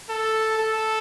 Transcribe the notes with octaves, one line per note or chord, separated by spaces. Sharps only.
A4
A4